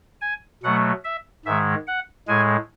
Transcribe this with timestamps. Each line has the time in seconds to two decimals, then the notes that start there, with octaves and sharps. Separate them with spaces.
0.21 G#5
0.63 B2 F#3 A3 F#5
1.04 E5
1.46 G#2 D#3 G#3 E5
1.87 F#5
2.27 A2 G#3 G#5